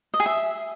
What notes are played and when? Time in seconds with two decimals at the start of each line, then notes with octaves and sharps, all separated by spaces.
0.14 D#5
0.20 G#4
0.26 E5